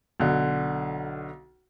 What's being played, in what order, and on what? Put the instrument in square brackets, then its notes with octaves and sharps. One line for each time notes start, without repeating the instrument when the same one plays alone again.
[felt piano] B1 D3